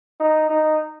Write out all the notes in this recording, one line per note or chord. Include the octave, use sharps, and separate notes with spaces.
D#4
D#4